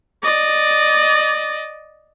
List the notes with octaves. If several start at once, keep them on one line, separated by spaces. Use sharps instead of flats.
D5 D#5